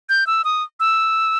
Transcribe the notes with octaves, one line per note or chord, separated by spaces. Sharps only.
G6
E6
D#6
E6